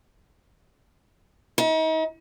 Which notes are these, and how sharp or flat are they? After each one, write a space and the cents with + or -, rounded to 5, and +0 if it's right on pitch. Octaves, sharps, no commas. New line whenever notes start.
D#4 +40